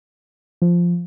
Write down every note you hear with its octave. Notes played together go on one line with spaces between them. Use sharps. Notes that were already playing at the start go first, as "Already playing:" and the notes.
F3